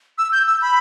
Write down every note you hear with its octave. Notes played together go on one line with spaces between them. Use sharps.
E6
G6
E6
B5